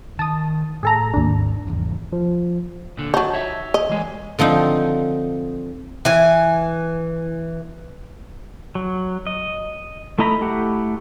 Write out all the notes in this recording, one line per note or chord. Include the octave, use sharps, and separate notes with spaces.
D#3 A5 D#6
A2 G#4 A4 A#5
G#1 D#2 G#2 D4
G#1 E2
F3
A#2 D3
D#2 F#3 D#4 A5
C#5 E5
D#5
E3 G#3
D3 F3 C4 D#4
E3 G#5
F#3
D#5
A3 E4 D#5 A#5 B5
A3 E4 G4 F#5